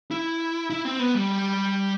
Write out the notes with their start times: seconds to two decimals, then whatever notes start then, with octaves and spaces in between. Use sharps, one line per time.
0.11 E4
0.70 E4
0.85 C4
0.99 B3
1.15 G3